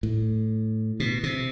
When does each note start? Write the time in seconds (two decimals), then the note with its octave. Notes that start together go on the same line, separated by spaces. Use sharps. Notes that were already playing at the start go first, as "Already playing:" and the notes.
0.03 A2
1.00 B2
1.23 C3